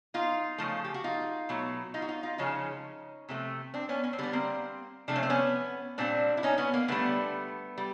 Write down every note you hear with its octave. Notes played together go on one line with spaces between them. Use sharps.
D#4 F4
C#3 F3 A3
G4
F#4
D#4 F4
B2 F#3 A3
D#4 F4
F#4
D#4 F4
D#4 F4
C#3 F3 G#3 C#4 D#4
C3 F3 A3
C4 D4
B3 C#4
C#4
C4
D3 G3 B3
A#3 C4
C3 F3 A3 D4
C#4
C4
B3 C#4
A#2 G3 C4 D4
E4
C#4 D#4
B3 C#4
A#3
D3 G3 A3 B3
G3